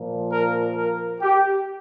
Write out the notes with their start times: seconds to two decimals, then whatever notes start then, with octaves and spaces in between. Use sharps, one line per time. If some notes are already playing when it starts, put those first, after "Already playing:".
Already playing: A#2 F3
0.30 A#4
0.76 A#4
1.21 G4